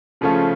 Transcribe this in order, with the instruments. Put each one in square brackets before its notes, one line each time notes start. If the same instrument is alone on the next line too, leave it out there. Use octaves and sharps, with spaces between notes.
[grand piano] C#3 F3 A3 C#4 F4